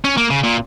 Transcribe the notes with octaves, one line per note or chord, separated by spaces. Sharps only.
C#4
A#3
C#3
A#2